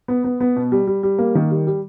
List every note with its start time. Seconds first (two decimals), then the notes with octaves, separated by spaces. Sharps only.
0.08 B3
0.24 B3
0.41 B3
0.56 B2
0.72 G3
0.87 G3
1.03 G3
1.19 A#3
1.35 D#3
1.51 G3
1.67 G3